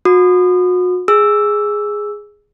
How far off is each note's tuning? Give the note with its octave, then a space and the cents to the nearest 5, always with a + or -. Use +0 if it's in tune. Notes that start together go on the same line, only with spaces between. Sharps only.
F#4 -35 D#6 -30
G#4 +0 E6 +0